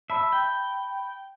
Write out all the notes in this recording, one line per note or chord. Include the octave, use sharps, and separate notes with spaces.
E5 A5 B5
G5